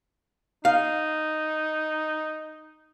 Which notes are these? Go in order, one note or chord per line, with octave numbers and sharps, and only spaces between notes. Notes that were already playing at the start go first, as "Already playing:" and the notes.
D#4 F5